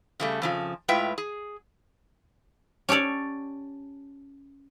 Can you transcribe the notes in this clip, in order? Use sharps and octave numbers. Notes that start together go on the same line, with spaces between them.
C#3 G3 A3
F2 C#3 F3
A2 G#3 F4 B4 E5 G5
G#4
C#4 G4 A4 C#5 D5